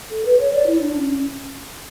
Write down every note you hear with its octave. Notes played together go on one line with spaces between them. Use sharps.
A4
B4
C#5
D5
E4
D4
C#4
C#4